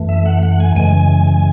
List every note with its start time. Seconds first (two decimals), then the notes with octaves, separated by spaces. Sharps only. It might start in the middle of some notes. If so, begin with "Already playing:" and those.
Already playing: F#2 E3 A3
0.09 E5
0.26 F#5
0.43 F#5
0.60 G#5
0.76 F#2 C#3 E3 G#3 G#5
1.27 G#5